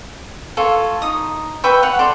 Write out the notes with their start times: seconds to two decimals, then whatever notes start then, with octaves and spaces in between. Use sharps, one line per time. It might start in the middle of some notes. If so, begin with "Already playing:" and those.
0.57 F4 A4 C#5
1.02 D#4 D#5 D#6
1.64 B4 E5 G5 C#6
1.83 C#5 F#5
1.99 A4 D5 C6 D6